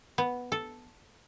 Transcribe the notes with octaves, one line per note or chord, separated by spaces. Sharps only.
B3
A4